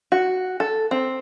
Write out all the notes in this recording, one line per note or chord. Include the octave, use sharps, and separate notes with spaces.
F#4
A4
C4